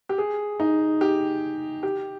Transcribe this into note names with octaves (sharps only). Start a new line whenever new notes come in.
G4
G#4
D#4
G4
G4